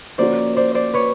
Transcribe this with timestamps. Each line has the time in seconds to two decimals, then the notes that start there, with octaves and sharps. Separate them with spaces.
0.18 F3 A#3 C#4 F#4 C5 D5
0.56 C5 D5
0.75 C5 D5
0.94 B4 C#5